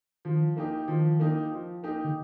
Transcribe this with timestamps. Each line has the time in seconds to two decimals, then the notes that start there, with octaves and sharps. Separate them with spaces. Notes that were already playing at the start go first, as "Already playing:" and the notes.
0.25 D#3 F3
0.56 A#3 D#4 G4
0.88 D#3 F3
1.19 A#3 D#4 G4
1.51 F3
1.83 A#3 D#4 G4
2.04 D3